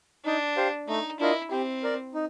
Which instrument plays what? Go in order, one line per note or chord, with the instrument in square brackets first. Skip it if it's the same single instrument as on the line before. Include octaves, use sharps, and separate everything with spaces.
[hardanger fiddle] D4 [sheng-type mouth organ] D#4
[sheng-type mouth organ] G4 C5 F5
[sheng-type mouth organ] A3 [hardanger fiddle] D#4
[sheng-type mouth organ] D4 F4 A#4 D#5 [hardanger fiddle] E4
[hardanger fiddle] C4 [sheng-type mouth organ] G4
[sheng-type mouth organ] A#4 D5
D#4